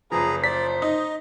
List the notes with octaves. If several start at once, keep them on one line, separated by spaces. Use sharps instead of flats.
F#1 F3 G#4 B4 A#5
C5 D5 B6
D#4 D#5